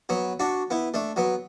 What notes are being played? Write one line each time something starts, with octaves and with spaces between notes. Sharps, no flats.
F#3 B3
D4 F#4
B3 E4
A3 D4
F#3 B3